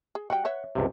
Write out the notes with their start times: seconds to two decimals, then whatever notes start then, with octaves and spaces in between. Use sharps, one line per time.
0.15 G#4
0.30 G3 F#4 F#5 G5
0.45 B4 C#5 E5
0.75 C#2 G2 C3